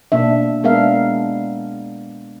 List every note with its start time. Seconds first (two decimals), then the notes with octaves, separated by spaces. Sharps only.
0.12 B2 A#3 D4 E5
0.64 G#3 B3 D4 A#4 E5 F5